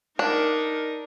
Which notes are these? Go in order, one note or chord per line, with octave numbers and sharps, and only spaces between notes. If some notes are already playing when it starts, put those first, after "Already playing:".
D4 D#4 A#4